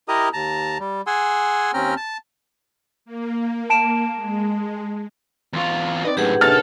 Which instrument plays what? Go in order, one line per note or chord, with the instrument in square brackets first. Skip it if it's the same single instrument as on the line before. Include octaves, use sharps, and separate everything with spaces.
[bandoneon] E4 G4 A#4 D#5 A#5 D#6
D#2 A5 A#5
G3
G#4 F#5 G#5 C6 E6
D#2 C4 C#4 G5 A#5 F6
A5
[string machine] A#3
[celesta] A5 D7 E7
[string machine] G#3
[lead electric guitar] E2 F4 [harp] A#5 C6 C#6
[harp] C4 D#4 B4 [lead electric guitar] D5 D#5
[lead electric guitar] F#2 A2 [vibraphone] G4 G#4 F#5
[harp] A#2 C#3 [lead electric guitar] A4 [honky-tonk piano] F6 A6